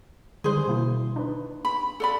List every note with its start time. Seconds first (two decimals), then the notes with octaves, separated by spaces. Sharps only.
0.44 D3 D#3 G3 G#4 C5
0.68 B2 A#3 E4
1.16 D4 D#4 B4
1.65 B5
2.00 A4 D5 B5